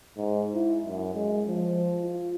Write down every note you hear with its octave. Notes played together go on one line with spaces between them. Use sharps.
G#2
E4
F#2
G#3
F3
F4